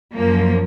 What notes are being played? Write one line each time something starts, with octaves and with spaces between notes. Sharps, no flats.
F#2 F3 A#3